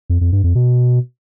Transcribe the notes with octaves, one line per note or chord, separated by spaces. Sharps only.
F2
F2
G2
F2
B2